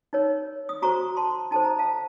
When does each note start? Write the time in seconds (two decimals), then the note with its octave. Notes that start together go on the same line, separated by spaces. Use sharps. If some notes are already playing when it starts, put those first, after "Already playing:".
0.13 D#4 A#4 C#5
0.69 D#6
0.82 F#4 A4 C5 A#5 C#6
1.17 A5 C6
1.51 D#4 A4 C5 A5
1.65 A#5
1.79 F5 A5